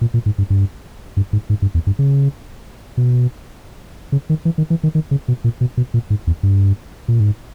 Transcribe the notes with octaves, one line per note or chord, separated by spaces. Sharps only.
A#2
A#2
G#2
G2
G2
G2
G#2
G#2
G2
E2
G2
C#3
B2
C#3
D#3
E3
D#3
E3
D#3
D#3
C#3
B2
A#2
B2
B2
A#2
G#2
E2
G2
A#2
G#2